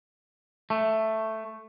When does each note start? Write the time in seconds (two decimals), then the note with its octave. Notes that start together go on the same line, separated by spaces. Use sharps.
0.70 A3